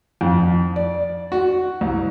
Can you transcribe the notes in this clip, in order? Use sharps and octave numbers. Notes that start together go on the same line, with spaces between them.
F2
D5
F#4
C2